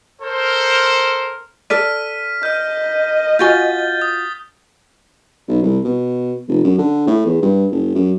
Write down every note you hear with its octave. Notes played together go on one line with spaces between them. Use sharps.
A4 A#4 C5
A4 D5 F6 B6 D#7
D#5 F6 G6
F4 F#4 G#5 G6 A6 G7
D#6
B1
C2
B2
F1
F#2
D3
A2
E2
G2
F#1
F#2